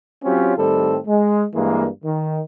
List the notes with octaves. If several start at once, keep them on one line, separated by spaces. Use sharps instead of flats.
F#3 C4 C#4 F4 G4
A2 D#3 G3 C4 A4
G#3
G2 E3 G#3 A#3
D#3